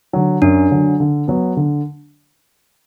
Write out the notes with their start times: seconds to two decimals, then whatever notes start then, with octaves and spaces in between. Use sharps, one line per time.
0.13 D3 F#3
0.42 F#2 D4
0.71 D3 F#3
1.00 D3
1.28 F#3 B3
1.57 D3